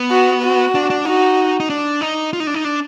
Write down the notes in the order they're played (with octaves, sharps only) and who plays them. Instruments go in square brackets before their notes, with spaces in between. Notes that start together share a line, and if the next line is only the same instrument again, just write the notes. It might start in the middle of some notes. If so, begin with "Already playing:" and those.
Already playing: [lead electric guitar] B3
[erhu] F#4
F#4
[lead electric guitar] D4
D4
[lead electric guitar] D#4 [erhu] F#4
[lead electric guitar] D#4
D4
D#4
F4
D#4
D4
D#4
D4